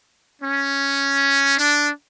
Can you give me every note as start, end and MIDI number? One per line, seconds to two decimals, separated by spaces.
0.42 1.54 61
1.57 1.89 62